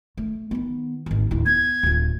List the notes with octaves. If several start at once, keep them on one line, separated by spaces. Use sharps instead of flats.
A3
D#3 B3
G#1 D#2
D1 E4
B3 G#6
D1 F4